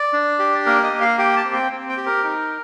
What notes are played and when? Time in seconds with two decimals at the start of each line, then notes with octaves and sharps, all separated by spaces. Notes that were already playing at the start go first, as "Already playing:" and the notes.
Already playing: D5
0.13 D4
0.39 G4
0.66 A#3 A#4
0.83 D#5
0.93 A#3
1.01 F5
1.18 G4 G5
1.37 A5
1.45 C4
1.53 G5
1.72 C4
1.89 G5
1.97 G4
2.06 A#4
2.24 D#4